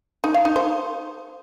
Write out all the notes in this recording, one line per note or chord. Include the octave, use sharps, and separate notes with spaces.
D#4
F5
D#4
C5